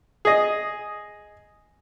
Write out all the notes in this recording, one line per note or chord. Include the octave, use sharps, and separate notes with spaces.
G#4 D#5